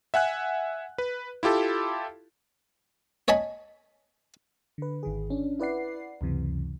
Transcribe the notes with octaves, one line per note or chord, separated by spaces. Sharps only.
E5 F#5 G#5 F#6
B4
E4 F4 G4 A4
C#5 D#5 G#5 A5 B5
D3 B4
G#1 D#3 G#4
C#4 D4
E4 B4 D5 F#5 C7
C#2 F#2 C3 E3